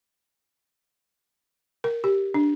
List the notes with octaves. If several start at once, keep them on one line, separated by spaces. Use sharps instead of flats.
A#4
G4
D4